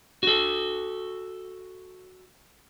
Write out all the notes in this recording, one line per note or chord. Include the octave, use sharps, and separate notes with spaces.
F#4 A4